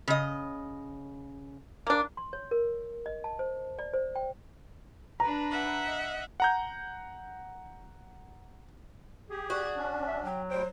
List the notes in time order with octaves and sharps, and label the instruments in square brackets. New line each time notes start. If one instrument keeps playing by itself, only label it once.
[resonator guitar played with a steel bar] C#3 D#5
[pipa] A#3 D4
[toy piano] C6
C#5
A#4
D#5
A5
C5
D5
C5
G5
[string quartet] D4 B4 [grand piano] A#5
[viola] E5 F#5
[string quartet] D#5
[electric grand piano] F#5 A#5 G6
[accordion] G4 [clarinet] G#4
[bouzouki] F#4 [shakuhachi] D5
[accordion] C#4 D4
[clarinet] E5
[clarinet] F#3 [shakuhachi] G5
[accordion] D2 G3 G5 [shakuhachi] C5